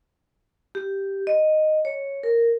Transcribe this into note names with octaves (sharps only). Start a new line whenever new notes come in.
G4
D#5
C#5
A#4